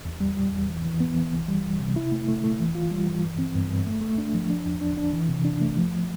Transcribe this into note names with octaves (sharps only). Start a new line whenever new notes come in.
E2
G3
G3
E2
E3
E3
B3
E3
C2
G3
C2
C3
E4
A3
A3
A3
E3
F4
G3
E3
G2
C4
G2
G2
A3
A3
D4
F3
D4
E2
D4
D4
E3
C3
D4
A3
F3